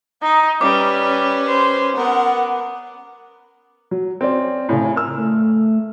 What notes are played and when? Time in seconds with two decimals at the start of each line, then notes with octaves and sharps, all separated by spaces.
0.22 D#4
0.61 G3 C#4 B4 D6
1.47 C5
1.96 B3 A#4 F#5
3.91 F#3
4.21 C4 C#4 D5
4.69 A2 C#3 G#5
4.96 A#4 E6 F6
5.18 A3